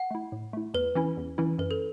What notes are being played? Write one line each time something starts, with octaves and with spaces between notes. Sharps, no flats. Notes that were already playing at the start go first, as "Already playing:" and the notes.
Already playing: F#5
A3 E4
A2
A3 E4
E2 B4
E3 C#4 E4
E2
E3 C#4 E4
F#2 B4
A4